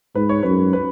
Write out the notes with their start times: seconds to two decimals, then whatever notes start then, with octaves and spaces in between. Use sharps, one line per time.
0.15 G#2 B4
0.29 C#5
0.43 F#2 B4
0.73 B4